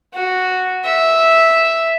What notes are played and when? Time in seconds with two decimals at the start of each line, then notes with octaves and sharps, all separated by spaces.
0.14 F#4
0.85 E5